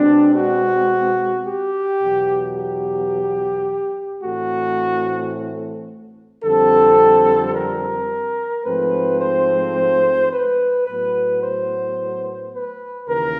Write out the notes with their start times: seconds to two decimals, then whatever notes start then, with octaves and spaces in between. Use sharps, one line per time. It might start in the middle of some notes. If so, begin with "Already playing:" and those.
Already playing: B2 G#3 C4 D4
0.34 F#4
1.45 G4
2.01 E2 B2 F#3
2.56 G4
4.23 A2 E3 A3 C4 F#4
6.44 F2 D3 G3 C4 A4
7.55 A#4
8.66 G#2 F3 A3 C4 B4
9.21 C5
10.32 B4
10.87 A2 F#3 B3 B4
11.43 C5
12.54 B4
13.09 D#2 C#3 E3 A#4